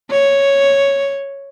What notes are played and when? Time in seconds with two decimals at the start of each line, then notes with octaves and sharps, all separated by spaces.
0.11 C#5